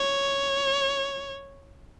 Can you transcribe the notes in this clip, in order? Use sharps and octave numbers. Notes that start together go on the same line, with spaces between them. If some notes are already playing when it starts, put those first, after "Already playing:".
Already playing: C#5